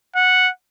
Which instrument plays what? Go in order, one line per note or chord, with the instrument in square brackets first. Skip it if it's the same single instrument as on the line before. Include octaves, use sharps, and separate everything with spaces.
[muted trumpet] F#5